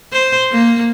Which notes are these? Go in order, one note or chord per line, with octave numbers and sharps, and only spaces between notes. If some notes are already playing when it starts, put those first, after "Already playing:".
C5
A#3